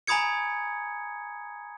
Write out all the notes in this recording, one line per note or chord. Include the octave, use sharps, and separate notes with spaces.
G#5 A#5 B5 D#6 G#6 C#7